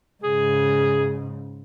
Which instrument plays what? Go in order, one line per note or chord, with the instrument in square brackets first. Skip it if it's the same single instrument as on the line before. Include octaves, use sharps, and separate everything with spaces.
[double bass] G#2 C#3 [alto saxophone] G#4